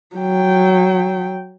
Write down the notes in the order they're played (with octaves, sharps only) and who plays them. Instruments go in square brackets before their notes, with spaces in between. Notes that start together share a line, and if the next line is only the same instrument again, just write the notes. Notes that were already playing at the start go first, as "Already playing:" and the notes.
[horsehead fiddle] F#3 G5